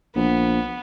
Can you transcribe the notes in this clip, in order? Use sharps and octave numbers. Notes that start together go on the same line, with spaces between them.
A#1 B3